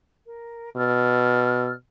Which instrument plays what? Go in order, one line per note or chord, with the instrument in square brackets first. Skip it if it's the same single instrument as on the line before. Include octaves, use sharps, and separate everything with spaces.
[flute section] A#4
[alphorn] B2 [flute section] D5 E6 F6